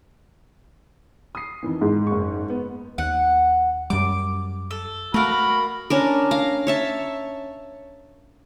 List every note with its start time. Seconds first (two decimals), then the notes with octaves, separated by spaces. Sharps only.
1.35 D#6 C7
1.63 F2 D#3 E3
1.81 G#2
2.07 F#1 C#6
2.50 B3
2.98 D#2 F#5
3.90 F#2 G3 D6
4.71 A4
5.14 A3 F#4 A#4 F5 B5
5.90 C#4 D4 A#4
6.31 F5 A#5
6.67 C#5 E5 A5